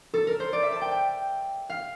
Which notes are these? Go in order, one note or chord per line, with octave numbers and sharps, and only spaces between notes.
A4
A#4
C5
D5
E5
A5
G5
G5
F5